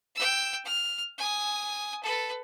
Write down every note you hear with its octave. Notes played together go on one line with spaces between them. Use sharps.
G5 E6
F6
G#5 D#6
A4 B4